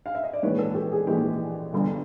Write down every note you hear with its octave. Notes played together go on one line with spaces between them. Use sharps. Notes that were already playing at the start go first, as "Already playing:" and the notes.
F5
E5
D#5
D5
A#1 G#2 E3 G#3 B4 C#5
A4 B4
G4 A4
G#4
A#1 G#2 E3 G#3 G4
G1 G2 D3